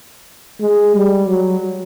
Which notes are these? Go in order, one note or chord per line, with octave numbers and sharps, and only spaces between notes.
G#3
G3
F#3